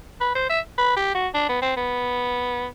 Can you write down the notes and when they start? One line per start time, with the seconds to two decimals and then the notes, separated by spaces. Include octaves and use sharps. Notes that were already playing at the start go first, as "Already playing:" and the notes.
0.21 B4
0.35 C5
0.50 E5
0.78 B4
0.97 G4
1.15 F#4
1.34 D4
1.49 B3
1.62 C4
1.77 B3